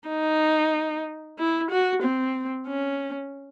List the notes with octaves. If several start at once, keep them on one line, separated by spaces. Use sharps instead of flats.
D#4
E4
F#4
C4
C#4